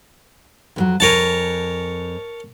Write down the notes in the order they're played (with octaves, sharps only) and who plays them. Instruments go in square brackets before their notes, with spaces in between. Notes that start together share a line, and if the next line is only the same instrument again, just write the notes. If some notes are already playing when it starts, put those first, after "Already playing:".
[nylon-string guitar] F2 E3 F#3
[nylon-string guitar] F2 F#4 G#5 [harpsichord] A#4 C#5 A5